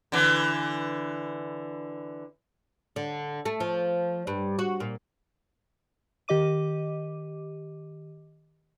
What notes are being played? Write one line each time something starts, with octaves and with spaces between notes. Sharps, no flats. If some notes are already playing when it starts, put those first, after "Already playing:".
D3 E3
D3
A3
F3
G2
F#4
A#2
D#3 G4 D#5 D6 D#7